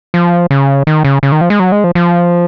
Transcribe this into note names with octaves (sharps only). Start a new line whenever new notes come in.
F3
C#3
D#3
C#3
C#3
D#3
F3
G#3
F#3
G#3
F3
F3